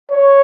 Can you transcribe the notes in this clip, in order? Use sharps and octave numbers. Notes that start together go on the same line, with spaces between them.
C#5